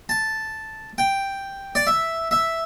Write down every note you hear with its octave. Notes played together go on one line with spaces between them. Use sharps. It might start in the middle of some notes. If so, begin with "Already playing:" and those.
A5
G5
D5
E5
E5